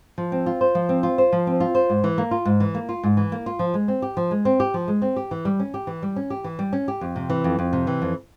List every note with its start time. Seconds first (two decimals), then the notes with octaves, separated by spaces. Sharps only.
0.18 F3
0.32 C4
0.46 F4
0.61 C5
0.75 F3
0.89 C4
1.03 F4
1.18 C5
1.33 F3
1.47 C4
1.60 F4
1.75 C5
1.90 G#2
2.04 E3
2.18 A#3
2.31 F4
2.45 G#2
2.60 E3
2.75 A#3
2.89 F4
3.03 G#2
3.17 E3
3.32 A#3
3.46 F4
3.59 F3
3.74 G#3
3.88 C4
4.02 G4
4.17 F3
4.31 G#3
4.45 C4
4.60 G4
4.74 F3
4.88 G#3
5.02 C4
5.16 G4
5.31 E3
5.45 G3
5.59 C#4
5.74 G4
5.87 E3
6.02 G3
6.16 C#4
6.30 G4
6.44 E3
6.59 G3
6.73 C#4
6.88 G4
7.01 F2
7.16 C3
7.30 E3
7.44 F2
7.59 F2
7.73 C3
7.87 E3
8.02 F2